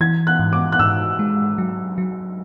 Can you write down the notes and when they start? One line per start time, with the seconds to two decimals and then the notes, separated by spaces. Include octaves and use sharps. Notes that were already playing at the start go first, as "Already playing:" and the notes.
0.01 E3 G#6
0.27 F#6
0.39 G#2
0.53 D6
0.72 F#6
0.79 G#2 E6
1.19 G#3
1.58 F#3
1.98 F#3